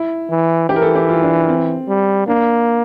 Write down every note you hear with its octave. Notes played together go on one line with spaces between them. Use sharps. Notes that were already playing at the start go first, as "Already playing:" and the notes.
Already playing: E4
E3
E3 G4
A#4
A4
G4
F4
D4
C4
G3
A#3 D4